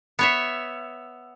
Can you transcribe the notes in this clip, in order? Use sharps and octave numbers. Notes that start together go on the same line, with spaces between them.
B3 C#5 E5